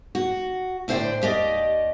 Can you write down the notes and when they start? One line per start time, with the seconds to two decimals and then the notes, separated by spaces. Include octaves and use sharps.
0.15 F#4
0.88 A2 D3 C5 D5 G5
1.22 D#2 G4 D5 D#5